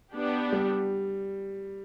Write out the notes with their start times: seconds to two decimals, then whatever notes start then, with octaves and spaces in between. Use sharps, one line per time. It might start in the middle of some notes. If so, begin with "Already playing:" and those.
0.13 B3 D4 G4
0.53 G3